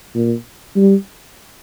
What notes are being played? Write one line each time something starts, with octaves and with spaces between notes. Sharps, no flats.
A#2
G3